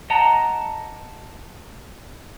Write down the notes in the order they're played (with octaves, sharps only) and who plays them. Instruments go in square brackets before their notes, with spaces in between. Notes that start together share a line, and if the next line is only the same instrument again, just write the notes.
[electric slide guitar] D#5 F#5 G5 A5 A#5